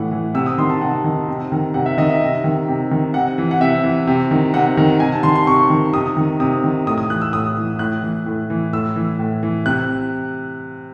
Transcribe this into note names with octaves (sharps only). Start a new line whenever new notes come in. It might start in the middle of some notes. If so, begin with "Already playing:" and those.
Already playing: A2 E3 F#5
E3
C3 E6
D#6
D#3 C6
A5
C3 F#5
D#3
C3
D#3
C3 F#5
E5
D#3 D#5
E5
C3
D#3
C3
D#3
C3 F#5
E3
F#5
C3 E5
E3
C3
D#3
C3 F#5
D#3
C3 G#5
A5
D#3 C6
C6
C3 C#6
D#3
C3 D#6
D#3
C3 D#6
D#3
A2 D#6
D#6
E3 F#6
E6
A2 D#6
E3
A2 F#6
E3
A2
E3
A2 E6
E3
A2
E3
C3 F#6